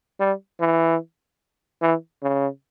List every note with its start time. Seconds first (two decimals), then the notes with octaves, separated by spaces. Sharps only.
0.20 G3
0.60 E3
1.82 E3
2.23 C#3